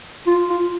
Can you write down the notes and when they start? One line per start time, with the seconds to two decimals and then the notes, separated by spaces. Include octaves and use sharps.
0.27 F4
0.50 F4